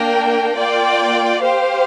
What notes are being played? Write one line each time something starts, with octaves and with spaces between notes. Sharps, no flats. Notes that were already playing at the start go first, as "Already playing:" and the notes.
Already playing: A#3 D4 A#4 G5
A#3 F4 D5 G5
G4 C5 F5